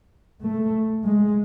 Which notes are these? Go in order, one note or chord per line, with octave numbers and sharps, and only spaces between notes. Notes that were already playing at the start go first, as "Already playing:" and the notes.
A3
G#3